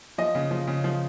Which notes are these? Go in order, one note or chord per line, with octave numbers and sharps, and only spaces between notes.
F3 D#5
C#3
F3
C#3
F3